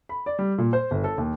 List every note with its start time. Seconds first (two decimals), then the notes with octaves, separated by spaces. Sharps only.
0.09 B5
0.26 D5
0.39 G3
0.58 A#2
0.73 C5
0.91 G1
1.04 A4
1.18 D#2